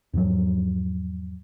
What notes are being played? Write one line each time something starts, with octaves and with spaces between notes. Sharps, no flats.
E2 G#2 F3 F#3